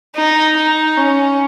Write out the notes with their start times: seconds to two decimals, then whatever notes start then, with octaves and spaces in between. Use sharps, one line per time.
0.15 D#4
0.56 D#4
0.97 C#4